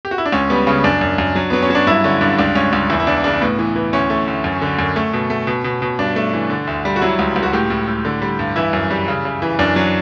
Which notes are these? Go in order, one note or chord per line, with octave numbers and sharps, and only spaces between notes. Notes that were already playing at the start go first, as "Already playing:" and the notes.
G4
F#4
E4
D4
C#2 C#4
G3 B3
C#3 C#4
F#2 D4
F#2
F#2
F#3
F#3 B3
C#4
F#3
D4
G2 E4
D3 C#4
G2 D4
C#2 D4
C#2 C#4
C#2 C#4
E2 E4
E4
E2 D4
C#3 D4
A2 B3
E3
E3
D2 C#4
A3
D2
F#2
D3
F#2
A3
B2
A3
B2
B2
B2
G2 D4
A3
E3
D3
D2
G3
F#4
F#3 E4
C#2
C#2
F#4
A2 G4
A2
A2
D3
G3
G2
E3 E4
F#2
G3
C#3
C#3
E3
F#2 D4
F#3